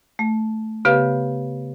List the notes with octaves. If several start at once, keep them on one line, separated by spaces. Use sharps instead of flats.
A3
C#3 B3 G4 B4 F5